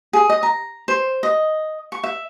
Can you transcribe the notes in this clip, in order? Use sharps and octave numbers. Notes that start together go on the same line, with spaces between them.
G#4
D#5
A#5
C5
D#5
C#6
E5